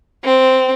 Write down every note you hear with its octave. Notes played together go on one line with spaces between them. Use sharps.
C4